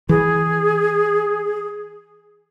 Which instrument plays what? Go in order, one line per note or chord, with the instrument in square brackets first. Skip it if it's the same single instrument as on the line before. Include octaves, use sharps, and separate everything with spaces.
[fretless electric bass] E3 [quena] G#4